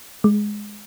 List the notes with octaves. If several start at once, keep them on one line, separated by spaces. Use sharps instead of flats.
G#3